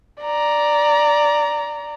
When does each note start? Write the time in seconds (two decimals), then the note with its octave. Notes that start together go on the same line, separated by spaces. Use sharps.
0.22 D5 A#5